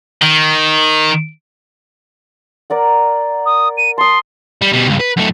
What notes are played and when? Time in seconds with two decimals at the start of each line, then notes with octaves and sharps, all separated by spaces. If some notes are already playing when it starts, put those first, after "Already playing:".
0.22 D#3
2.70 A#4 D5 F#5
3.46 D#6
3.77 D#7
3.98 A5 C6 D#6
4.61 G3
4.73 B2 G3
4.87 C#2 G2
4.99 B4
5.17 F#2 A3